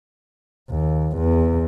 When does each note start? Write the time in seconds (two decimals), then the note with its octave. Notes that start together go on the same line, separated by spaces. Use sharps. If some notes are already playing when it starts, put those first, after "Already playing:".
0.69 D#2
1.16 E2